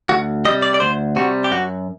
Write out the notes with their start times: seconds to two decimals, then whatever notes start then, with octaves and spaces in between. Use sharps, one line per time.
0.09 D2 F#4
0.45 G3 D#5
0.48 C3
0.62 D5
0.74 D5
0.80 D2 C5
1.16 C3 G3 F#4
1.44 G4
1.51 F#2 F#4